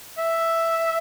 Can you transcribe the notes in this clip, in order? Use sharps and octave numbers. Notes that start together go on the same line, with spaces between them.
E5